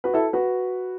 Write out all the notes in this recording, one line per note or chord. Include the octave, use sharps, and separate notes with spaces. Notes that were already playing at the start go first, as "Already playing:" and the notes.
F#4 B4
E4 A4
F#4 B4